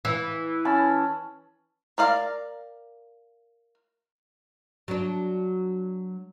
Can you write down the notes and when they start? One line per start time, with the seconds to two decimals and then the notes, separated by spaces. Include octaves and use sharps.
0.05 E3
0.65 C#4 A5 B5
1.98 A#4 D5 F5 A#5
4.88 F#3 D4